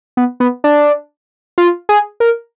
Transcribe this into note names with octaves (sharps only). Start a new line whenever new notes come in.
B3
B3
D4
F4
G#4
A#4